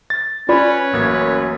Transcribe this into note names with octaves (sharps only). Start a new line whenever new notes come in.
A6
C#4 F4 B4 C#5 D5 B5
A1 F#2 A#3 G#6